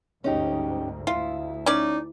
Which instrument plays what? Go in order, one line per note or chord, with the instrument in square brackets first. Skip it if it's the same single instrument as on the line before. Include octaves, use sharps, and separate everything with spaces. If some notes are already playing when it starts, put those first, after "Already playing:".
[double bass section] G1 D2 G#2 [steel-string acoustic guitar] C#4 D#4 G4
[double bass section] D2 [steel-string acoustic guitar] E4 [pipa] F4
[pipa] C#4 D5 [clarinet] D#4